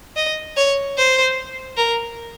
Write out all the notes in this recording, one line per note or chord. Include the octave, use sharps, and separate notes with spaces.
D#5
C#5
C5
A#4